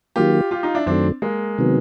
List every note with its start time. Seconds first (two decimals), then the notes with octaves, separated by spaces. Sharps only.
0.16 D#3 F#3 A#3 F4 G4
0.51 F4 G4
0.63 D#4 F4
0.75 D4 E4
0.86 F#2 D#3 F#3 A3 C4 D4
1.22 G#3 A#3
1.58 C3 D#3 F#3 B3